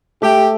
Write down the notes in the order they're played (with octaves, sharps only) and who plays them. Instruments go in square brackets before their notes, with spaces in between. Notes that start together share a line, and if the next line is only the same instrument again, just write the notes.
[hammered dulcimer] A3 [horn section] G4